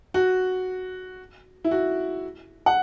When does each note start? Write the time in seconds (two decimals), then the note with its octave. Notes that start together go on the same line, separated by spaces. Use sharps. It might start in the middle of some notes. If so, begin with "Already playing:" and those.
0.14 F#4
1.65 E4
1.71 F#4
2.66 F#5